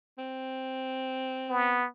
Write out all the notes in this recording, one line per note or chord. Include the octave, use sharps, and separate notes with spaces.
C4
B3